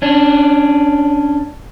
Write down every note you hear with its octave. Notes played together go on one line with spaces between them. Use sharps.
C#4 D4